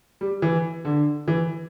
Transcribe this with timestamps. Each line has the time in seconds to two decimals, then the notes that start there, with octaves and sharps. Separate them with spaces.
0.21 G3
0.42 E3
0.85 D3
1.28 E3